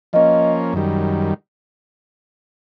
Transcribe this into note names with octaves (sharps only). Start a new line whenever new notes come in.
F3 A#3 C#4 D#5
F#2 D#3 G3